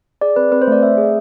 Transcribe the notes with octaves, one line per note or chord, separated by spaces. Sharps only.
G#4 D5
C4 B4
C4 B4
C5
A3 D5
A3 E5
G#4